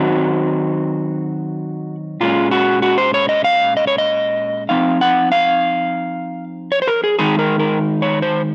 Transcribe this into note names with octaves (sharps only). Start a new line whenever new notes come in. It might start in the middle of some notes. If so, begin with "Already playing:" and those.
Already playing: D#3 F#3 C4 D#4 F#4
A#2 G#3 C#4 F4
F#4
F#4
C5
C#5
D#5
F5
D#5
C#5
D#5
F3 C4 D#4 F5
F#5
F5
C#5
C5
A#4
G#4
D#3 G#3 D#4 G#4
A#4
A#4
C#5
C5